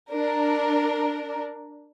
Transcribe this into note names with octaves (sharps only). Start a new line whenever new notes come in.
D4 A#4